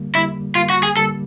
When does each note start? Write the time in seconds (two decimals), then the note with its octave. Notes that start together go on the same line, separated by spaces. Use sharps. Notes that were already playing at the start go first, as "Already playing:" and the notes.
Already playing: D3 G3 A#3
0.14 D3 G3 A#3 E4
0.55 D3 G3 A#3 F4
0.70 F#4
0.83 G#4
0.97 D3 G3 A#3 A4